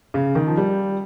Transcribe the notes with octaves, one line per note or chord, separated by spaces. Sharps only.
C#3
D#3
F3
G3